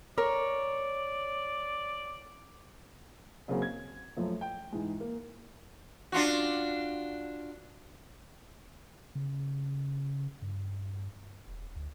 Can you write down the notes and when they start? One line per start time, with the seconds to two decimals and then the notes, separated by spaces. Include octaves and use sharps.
0.18 A#4 C#5 D5
3.48 F#2 C#3 A#3 C4 F#4
3.62 G#6
4.17 F#2 F3 A3
4.41 G5
4.72 G#2 E3 G#3
5.00 A#3
6.12 D4 F4 F#4
9.15 C#3
10.42 G2
11.47 E1
11.76 D2